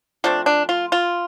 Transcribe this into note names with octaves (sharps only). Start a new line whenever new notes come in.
F3 A3 C4 D4
D4
F4
F4